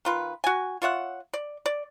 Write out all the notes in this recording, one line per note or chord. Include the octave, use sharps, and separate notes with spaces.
D#3 F4 B4
F#4 G#5
F4 C#5 E5 F#5
D5
D5